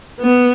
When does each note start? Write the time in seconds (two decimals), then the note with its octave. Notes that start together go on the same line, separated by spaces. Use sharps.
0.20 B3